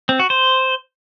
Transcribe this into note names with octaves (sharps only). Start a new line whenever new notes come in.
C4
F#4
C5